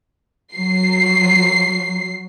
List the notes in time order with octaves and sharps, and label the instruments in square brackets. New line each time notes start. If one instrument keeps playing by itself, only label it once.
[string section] F#3 C7